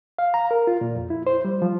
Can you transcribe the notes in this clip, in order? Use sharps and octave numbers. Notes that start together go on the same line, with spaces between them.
F5
A#5
A#4
F4
A#2
F2
E4
C5
G3
F3